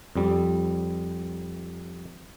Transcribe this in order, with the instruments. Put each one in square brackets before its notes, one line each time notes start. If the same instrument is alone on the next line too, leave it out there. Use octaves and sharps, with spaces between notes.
[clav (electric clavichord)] F2 G3